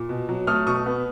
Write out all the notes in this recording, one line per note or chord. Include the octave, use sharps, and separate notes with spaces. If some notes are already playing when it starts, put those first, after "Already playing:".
Already playing: A#2
B2
F#3
A3 D#6 F6
B2 C#6 D#6
B3